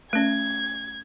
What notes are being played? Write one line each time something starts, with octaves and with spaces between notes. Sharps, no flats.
A3 C#4 G#6